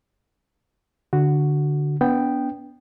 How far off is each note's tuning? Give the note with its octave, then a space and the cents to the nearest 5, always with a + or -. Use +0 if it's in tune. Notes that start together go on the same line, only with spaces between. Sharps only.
D3 +0 F#4 +0
B3 -5 D4 -30 G5 +0